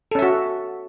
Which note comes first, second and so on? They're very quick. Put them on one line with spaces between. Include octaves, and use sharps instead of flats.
A4 C#4 E5 F#4